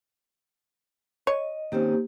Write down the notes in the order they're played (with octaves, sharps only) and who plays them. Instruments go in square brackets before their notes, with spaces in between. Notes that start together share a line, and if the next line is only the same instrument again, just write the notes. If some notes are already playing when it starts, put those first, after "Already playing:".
[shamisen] C#5 [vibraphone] D#5
[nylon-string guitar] D#3 C4 C#4 [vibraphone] A#3 G4